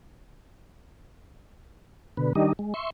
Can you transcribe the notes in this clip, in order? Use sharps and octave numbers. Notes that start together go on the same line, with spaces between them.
B2 D3 B4
D#3 G3 D4 D#4 G4 D#5
G#3
E5 C6 C#6